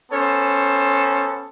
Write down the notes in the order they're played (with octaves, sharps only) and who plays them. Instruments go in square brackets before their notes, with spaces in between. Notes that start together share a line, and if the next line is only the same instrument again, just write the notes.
[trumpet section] B3 C#4 A4 C5 A5